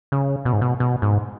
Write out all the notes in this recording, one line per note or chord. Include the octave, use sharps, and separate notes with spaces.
C#3
B2
G#2
B2
B2
G#2